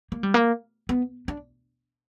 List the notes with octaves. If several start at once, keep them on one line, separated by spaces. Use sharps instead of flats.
A#3
G3
A#3
B3
D4